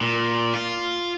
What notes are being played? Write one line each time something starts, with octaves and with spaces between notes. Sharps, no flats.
A#2
F4